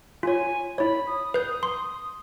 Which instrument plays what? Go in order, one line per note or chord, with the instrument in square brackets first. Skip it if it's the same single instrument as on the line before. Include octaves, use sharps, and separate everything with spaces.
[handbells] F4 C#5 [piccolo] G#5
[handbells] E4 C#5 [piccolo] B5
[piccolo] D#6
[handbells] B4 G6
C6